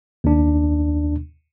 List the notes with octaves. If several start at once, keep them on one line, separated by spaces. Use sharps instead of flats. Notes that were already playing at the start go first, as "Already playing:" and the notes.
D#2 D4